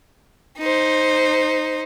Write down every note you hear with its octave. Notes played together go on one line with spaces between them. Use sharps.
D#4 C5